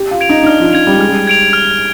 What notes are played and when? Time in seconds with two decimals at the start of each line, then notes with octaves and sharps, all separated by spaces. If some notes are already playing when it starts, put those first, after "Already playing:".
Already playing: G4
0.11 F4
0.21 G#6 D7 F7
0.29 D#4
0.43 D#4
0.47 D4 F6
0.60 F3
0.73 F3 G#6 D7 F7
0.87 G3
0.98 G#3 F6
1.09 G3
1.27 G#6 D7 F7
1.53 F6